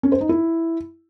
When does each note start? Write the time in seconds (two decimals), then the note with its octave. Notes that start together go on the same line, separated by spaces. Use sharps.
0.03 C#4
0.12 C5
0.21 D#4
0.29 E4